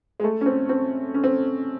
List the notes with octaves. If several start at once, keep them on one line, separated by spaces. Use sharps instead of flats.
G#3
A3
C#4
C4
C4
C#4
C4